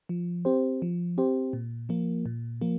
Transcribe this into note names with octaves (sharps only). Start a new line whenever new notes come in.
F3
C4 G4 C5
F3
C4 G4 C5
A#2
F3 A#3
A#2
F3 A#3